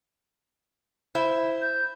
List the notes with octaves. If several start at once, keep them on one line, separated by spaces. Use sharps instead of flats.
E4 C5 E5
G6